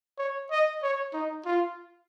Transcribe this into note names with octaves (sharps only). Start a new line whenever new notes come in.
C#5
D#5
C#5
D#4
F4